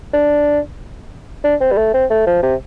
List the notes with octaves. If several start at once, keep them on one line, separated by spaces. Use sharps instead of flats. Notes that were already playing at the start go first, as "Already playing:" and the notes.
D4
D4
C4
G3
A3
C4
A3
F3
C3